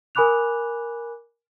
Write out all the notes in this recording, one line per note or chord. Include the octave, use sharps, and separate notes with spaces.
A#4 G#5 B5 D6 F#6 F7